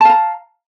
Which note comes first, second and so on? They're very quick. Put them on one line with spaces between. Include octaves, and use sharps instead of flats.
A5 F5 A#5